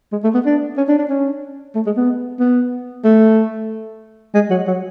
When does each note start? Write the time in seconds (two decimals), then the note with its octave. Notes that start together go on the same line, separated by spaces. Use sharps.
0.12 G#3
0.24 A3
0.34 B3
0.46 D4
0.77 C#4
0.88 D4
0.99 D4
1.10 C#4
1.75 A3
1.86 G#3
1.97 B3
2.40 B3
3.04 A3
4.34 G#3
4.50 F#3
4.67 F#3